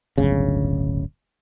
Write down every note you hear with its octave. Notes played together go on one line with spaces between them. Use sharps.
D1 G1 C#3